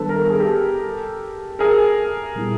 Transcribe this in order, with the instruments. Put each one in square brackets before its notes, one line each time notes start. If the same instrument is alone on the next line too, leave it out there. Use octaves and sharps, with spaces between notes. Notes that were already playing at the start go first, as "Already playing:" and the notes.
Already playing: [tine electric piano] D#3 G3 B3 D4 [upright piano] A4 B4
[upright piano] A#4
A4
G#4
G4 A4
G#4 A#4
[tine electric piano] A#2 G3 B3 E4